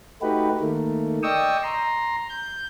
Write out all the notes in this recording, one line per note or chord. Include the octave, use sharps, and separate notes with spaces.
A3 D#4 F#4 G4 B4
D#3 A3 A#3
D5 D#5 G5 C#6 D#6 E6
A#5 C6
G6